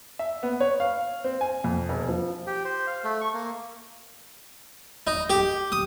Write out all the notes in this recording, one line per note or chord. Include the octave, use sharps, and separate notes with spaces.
E5
B3
C#5
F5
C4
G#5
F2
E1
F3
G4
C5
F5
A3
C#6
A#3
D#4
G4
D#6